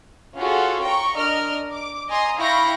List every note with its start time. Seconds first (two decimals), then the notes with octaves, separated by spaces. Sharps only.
0.36 C#4 F4 F#4 G#4 A4
0.82 G5 A#5 C#6
1.16 D4 A#4 D#5 F6
1.72 D6
2.08 D#5 G#5 A#5 C6 D#6
2.38 E4 F5 G5 B5 C#6 A#6